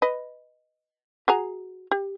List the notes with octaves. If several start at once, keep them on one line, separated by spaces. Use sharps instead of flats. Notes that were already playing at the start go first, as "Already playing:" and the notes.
B4 D#5
F#4 G#4 A#5
G4